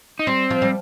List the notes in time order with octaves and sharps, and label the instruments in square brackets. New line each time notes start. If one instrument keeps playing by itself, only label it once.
[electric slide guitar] D#4
[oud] G3 [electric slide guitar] C4
[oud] F3
G3